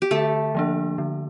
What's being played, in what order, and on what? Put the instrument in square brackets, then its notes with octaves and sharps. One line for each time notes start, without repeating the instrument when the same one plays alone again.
[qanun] G4
[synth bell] D3 [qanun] A3 A4
[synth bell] F3 A#3 D4
D3